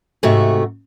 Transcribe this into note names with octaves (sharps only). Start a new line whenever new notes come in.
G#2 C3 A3 F#4